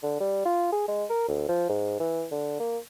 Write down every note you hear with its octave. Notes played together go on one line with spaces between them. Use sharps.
D3
G3
F4
G#4
G#3
A#4
D2
F3
G#2
E3
D3
A#3